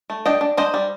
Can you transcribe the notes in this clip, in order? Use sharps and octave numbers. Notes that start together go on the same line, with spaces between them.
A3
D4 D#5 G5
D4
D4 C5 D#5
G3